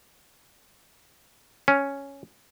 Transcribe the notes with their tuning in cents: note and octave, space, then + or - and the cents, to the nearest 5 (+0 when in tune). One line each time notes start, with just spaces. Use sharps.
C#4 +0